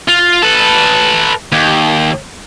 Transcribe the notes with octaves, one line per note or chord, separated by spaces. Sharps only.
F4
A4 B4
D#2